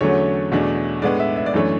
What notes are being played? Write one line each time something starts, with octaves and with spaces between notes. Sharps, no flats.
E2 D3 F#3 A3 C#4 C#5
E2 B2 A3 D4
A2 G#3 B3 D4 D5
E5
E5
D5
F#2 E3 A3 D4 C#5